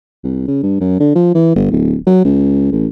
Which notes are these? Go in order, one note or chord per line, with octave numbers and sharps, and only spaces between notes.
C2
C#3
G2
F#2
D3
F3
E3
G1
D1
F#3
C#2
A1